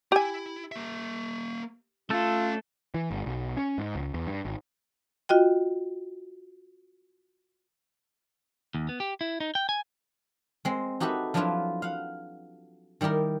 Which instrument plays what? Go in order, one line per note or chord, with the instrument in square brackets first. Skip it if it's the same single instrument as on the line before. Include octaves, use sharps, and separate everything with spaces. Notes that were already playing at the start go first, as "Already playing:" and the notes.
[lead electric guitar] E4 [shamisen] G4 G#5
[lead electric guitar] A#3 E5
[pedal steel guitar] A3 A4 [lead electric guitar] C#4 A5 [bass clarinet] F4
[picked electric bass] E3
G1
B1
C#4
G#2
C#2
E2
G2
G#1
[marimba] F4 F#4 D#5 G5
[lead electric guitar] D#2
B3
G4
E4
D#4
G5
G#5
[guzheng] G#3 C4
D#4 F#4 G4 A4 B4 E5
F3 F#3 D4 E4 F4 B4
F5 F#5
D#3 G3 E4 G4 A#4